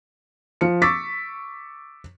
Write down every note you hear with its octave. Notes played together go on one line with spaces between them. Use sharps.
F3 C#7
C#6 D6 E6 A6 B6